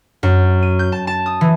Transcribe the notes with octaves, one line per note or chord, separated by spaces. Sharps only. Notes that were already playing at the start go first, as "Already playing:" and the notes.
F#2
D#7
G6
A5
A5
D#6
E3